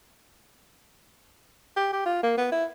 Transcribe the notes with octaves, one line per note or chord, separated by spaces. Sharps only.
G4
G4
F4
A#3
B3
E4